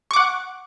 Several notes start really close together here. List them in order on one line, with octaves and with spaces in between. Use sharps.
C#6 D6 F#5